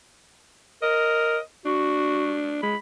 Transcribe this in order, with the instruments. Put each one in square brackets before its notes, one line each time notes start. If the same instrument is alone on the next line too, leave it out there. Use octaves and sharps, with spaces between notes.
[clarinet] A#4 [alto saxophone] D#5
[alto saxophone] D4 [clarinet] F#4
[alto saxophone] G#3 [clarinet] B5